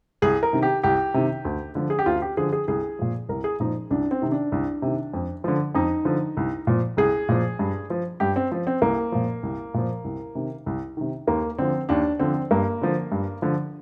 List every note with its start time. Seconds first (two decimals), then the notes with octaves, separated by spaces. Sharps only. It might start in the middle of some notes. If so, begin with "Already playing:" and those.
0.22 C2 G#4
0.43 A#4
0.53 C3 D#3
0.63 G4
0.83 C2 G4
1.14 C3 D#3
1.45 D2
1.75 D3 F3
1.90 G#4
1.99 G4
2.06 D2 F4
2.22 G4
2.37 D3 F3 G#4
2.53 G#4
2.68 C2 G#4
2.99 A#2 F3
3.29 C2 A#4
3.44 G#4
3.60 A#2 F3 D#4
3.90 C2 D4
4.11 C4
4.22 C3 D#3
4.32 D4
4.52 C2
4.82 C3 D#3
5.13 F2
5.44 D3 F3
5.75 F2 D#4
6.05 D3 F3
6.37 C2
6.67 A#2 F3
6.97 C2 G#4
7.29 A#2 F3
7.59 G2
7.90 F3
8.20 G2 G4
8.36 C4
8.52 F3
8.67 C4
8.82 C2 A#3
9.12 A#2 F3
9.43 C2
9.74 A#2 F3
10.04 C2
10.35 C3 D#3
10.66 C2
10.97 C3 D#3
11.27 D#2 A#3
11.58 D3 F3 C4
11.89 D#2 D4
12.20 D3 F3 C4
12.51 G2 A#3
12.81 D3 F3
13.12 G2
13.42 D3 F3